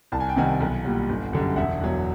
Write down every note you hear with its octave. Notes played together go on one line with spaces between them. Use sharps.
C2 A5
G#5
G5
C3 D#3 G3 F#5 G#5
B1
A#2 G3
G1
F#2 D3 G3
E1 E5 F#5
E2 B2 F#3